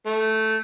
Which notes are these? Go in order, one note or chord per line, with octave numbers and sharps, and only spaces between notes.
A3